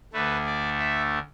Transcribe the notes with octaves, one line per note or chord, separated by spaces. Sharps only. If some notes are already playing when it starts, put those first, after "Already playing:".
D2 D3 A3 B4
D5
E5